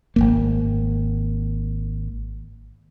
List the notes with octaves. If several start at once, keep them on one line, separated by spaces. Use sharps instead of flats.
G#1 E2 A#3